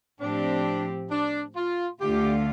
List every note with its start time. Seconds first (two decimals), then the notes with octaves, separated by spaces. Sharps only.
0.20 A2 F3 C4 D4 G4
1.11 D4
1.56 F4
2.01 D2 D3 A3 F4 G4